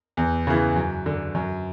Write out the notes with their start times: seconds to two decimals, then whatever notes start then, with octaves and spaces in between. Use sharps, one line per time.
0.17 E2
0.47 C#3 E3
0.76 F#2
1.06 D3
1.35 F#2